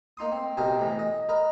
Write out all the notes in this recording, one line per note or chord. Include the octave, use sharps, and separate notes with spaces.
A#3 D#4 C6 D#6
C4
B1 C3 C4 A#4 C5 D#5
A2 E3
D#5
A#4 B4 D#5 A#5